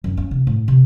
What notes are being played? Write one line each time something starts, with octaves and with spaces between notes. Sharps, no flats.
F#2
C#4
C3
A2
C3